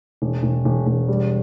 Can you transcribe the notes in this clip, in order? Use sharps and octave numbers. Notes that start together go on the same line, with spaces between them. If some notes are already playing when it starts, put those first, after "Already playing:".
E1
E1
E1
E1
G3